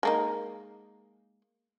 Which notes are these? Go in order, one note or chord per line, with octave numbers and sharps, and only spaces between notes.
G#3 A#3 D#4